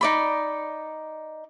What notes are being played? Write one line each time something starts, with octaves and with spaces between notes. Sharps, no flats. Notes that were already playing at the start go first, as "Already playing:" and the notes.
D#4 D5 B5